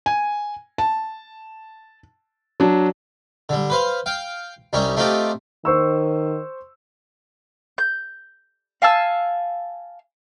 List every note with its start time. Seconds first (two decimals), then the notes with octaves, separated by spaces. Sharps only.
0.06 G#5
0.78 A5
2.60 F#3 D4
3.49 D3 G3
3.70 B4 C5 F5
4.06 F5 G5
4.73 C2 G3 C#4 D#4 C#5
4.97 A3 C4 D#4 F4 G4 A4
5.65 D#3 C5 C#6 E6
7.78 G6
8.82 F5 G#5 A5 E6